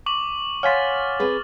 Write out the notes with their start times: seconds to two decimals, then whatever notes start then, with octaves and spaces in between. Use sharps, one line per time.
0.06 C#6 D6 F#7
0.63 C#5 F5 F#5 G#5 C6 F6 A6 B6
1.20 C4 G#4 B4